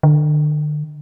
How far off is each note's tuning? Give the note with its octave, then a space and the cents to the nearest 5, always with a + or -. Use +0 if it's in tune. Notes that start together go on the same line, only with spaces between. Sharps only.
D3 +35